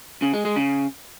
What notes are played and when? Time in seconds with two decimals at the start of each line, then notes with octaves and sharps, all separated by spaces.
0.22 C#3
0.34 G#3
0.45 G#3
0.56 C#3